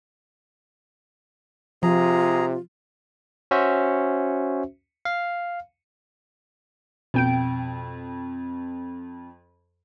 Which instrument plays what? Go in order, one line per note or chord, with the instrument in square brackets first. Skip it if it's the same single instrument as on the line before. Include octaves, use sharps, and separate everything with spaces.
[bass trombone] C3 [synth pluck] F3 [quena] F4 [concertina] G#4 A#5
[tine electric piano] C#4 F#4 C5 E5
F5
[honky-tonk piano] F2 [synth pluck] B2 G5 D7